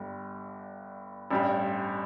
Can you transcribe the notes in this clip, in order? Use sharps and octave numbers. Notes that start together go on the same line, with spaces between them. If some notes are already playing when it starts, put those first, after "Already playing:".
Already playing: G1 G2 G3
A1 G2 G3 D4